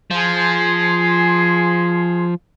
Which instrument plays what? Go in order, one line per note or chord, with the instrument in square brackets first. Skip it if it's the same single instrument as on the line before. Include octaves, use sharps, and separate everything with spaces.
[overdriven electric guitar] F3 [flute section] G#4 C6